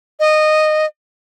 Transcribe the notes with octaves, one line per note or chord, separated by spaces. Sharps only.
D#5